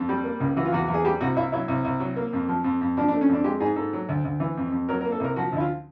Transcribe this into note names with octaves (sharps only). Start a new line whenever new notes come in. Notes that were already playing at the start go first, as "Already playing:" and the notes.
Already playing: F2
G3
A#3
C#2
E3 F#4
F4
E2 F#4
E2
G#4
G3 G4
C2 F#4
C2 E4
F#3 E4
C2
C2
F#3
A#3
F2
F3
F2
F2
F3 D4
D4
A3
C#4
F2 D4
G#3 G4
G#2 G#4
G#2 A4
F#3
D2
D2
E3
F2
F2
F#3 A#4
A#4
A#3
A4
C2 A#4
F3 F#4
D2 E4
F4